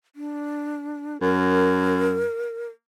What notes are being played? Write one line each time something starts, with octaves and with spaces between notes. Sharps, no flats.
D4
F#2 A#4